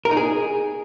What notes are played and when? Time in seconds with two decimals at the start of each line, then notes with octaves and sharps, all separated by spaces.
0.05 A#4
0.11 D#4
0.17 G#4